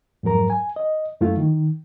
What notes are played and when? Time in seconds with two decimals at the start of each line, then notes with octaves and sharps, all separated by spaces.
0.23 F2 G#2 F#3 A#4 A#5
0.50 G#5
0.76 D#5
1.21 F#2 A3 E4 F4
1.37 D#3